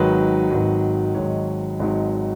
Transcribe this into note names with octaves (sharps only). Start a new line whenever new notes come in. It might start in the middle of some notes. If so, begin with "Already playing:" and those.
Already playing: G#1 G#2 D#3 F#3 B4
G#1 G#2 D#3 F#3
G#1 G#2 D#3 F#3 C#5
G#1 G#2 D#3 F#3